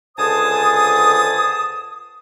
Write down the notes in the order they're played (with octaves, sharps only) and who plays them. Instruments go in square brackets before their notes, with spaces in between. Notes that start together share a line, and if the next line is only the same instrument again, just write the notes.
[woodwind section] C#2 D3 C5 G#5 A5 D#6